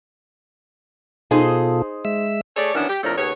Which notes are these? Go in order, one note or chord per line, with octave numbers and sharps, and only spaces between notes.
B2 D#4 F4 G#4 A4 C5
G#3 E5 E6
A3 G#4 A4 C#5 D5
D#3 E3 F#3 B3 C#4 D4
G4
F2 A2 F3 A3 D4 A#4
D#2 C#3 B3 C#5